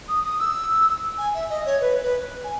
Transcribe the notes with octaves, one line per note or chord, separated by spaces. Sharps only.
D#6
D#6
E6
G#5
E5
D#5
C#5
B4
B4
G#5